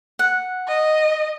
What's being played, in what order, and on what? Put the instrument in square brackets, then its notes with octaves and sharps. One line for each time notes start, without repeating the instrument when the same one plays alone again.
[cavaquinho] F#5
[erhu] D#5